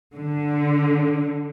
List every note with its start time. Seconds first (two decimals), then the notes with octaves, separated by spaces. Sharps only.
0.16 D3